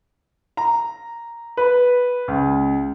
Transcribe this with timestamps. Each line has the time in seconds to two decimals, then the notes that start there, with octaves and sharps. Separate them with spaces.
0.57 A#5
1.57 B4
2.28 C#2